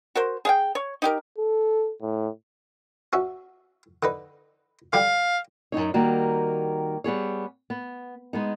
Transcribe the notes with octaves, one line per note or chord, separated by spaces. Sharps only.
F#4 A#4 C5
G#4 F5 G5
C#5
D#4 G4 A#4
A4
A2
C#4 F#4 E5
D3 D#4 B4
D3 G3 G4 F5
F#2 C#3 D#4 C#5
D#3 G3 A#3 F#4
G3 B3 G#4 C#5
B3
G#3 B3 D#4